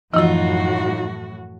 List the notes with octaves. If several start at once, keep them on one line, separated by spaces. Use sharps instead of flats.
F#2 A2 E3 F3 D#4 F4 F#4